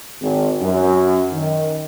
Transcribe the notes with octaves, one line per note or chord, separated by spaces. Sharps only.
G#1
F#2
D#3